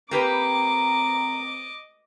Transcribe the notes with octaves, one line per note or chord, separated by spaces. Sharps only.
A#3 C4 G4 B4 D#5 A#5 D6